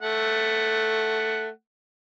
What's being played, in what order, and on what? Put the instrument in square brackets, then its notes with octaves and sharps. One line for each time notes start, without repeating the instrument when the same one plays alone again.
[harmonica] A3 F#5